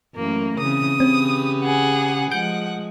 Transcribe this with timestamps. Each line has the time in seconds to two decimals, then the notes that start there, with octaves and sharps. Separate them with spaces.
0.15 F#2 E3 A3 A#3
0.59 C#3 E3 C4 D#6
1.00 C#3 C4 C#4 G4 B4
1.64 G#4 F#5
2.31 F3 G#3 F#5 G6 D7